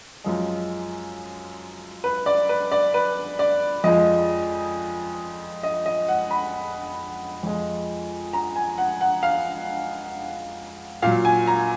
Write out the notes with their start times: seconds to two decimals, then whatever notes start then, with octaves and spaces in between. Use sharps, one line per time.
0.24 F#2 F3 G#3
2.04 B4
2.26 D5
2.49 B4
2.72 D5
2.94 B4
3.39 D5
3.84 F2 F3 G#3 D#5
5.63 D#5
5.86 D#5
6.09 F#5
6.31 B5
7.43 F2 F3 G#3
8.33 A#5
8.56 G#5
8.78 F#5
9.01 F#5
9.23 F5
11.02 A#2 F#3 F5
11.25 G#5
11.47 A#5